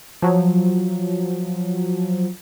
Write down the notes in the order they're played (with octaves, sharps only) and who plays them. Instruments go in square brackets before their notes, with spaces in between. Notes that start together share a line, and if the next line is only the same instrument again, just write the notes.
[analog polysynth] F3 F#3